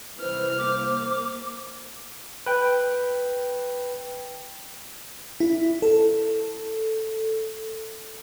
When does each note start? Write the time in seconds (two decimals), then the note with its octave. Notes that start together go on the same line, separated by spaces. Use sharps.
0.20 C2 E3 C5 F6
0.58 A#3 D6
2.46 B4 G5
5.40 E4
5.82 A4